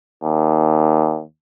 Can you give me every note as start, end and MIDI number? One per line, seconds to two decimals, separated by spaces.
0.23 1.22 39